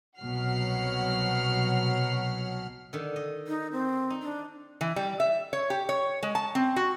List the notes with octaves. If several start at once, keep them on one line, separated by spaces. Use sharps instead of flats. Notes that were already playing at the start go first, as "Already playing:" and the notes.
C2 B2 F#3 F#5 F6 C7
D3 D#3
D#5
D#4
C4
D#4
D4
E3
G3
E5
C#5
G4
C#5
G#3
A5
C4
F#4